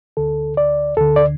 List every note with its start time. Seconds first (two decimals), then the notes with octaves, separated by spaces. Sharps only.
0.17 D2 D3 A4
0.57 D5
0.97 D2 D3 A4
1.16 D5